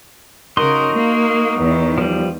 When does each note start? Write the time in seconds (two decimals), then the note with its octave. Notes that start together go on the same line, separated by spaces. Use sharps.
0.57 C#3 D#4 F#4 A#4 C6
0.92 A#3
1.60 E2 D#3
1.98 F3 G3